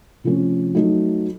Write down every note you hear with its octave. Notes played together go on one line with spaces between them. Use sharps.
C3 F3 A3 C#4
F#3 A3 D#4